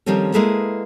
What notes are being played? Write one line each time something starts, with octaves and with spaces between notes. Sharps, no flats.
D#3 F3 G3 C4 C#4 A4
G#3 A#3 E4 G#4 A4 B4